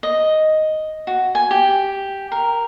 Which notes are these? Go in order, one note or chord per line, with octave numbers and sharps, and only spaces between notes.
D#5
F#4
G#5
G4
A#4